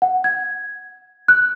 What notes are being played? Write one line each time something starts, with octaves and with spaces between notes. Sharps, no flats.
F#5
G#6
F#6